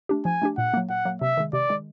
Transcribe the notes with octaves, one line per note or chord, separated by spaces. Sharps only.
A3 D4 G4
F3 G#5
A3 D4 G4
A#2 F#5
F#3 A#3
A#2 F#5
F#3 A#3
C3 E5
D#3 G#3
C3 D5
D#3 G#3